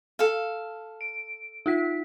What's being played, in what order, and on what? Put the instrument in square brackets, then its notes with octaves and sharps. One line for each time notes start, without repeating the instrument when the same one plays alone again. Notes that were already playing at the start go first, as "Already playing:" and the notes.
[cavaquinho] A4 F5
[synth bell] D7
D#4 F4 B6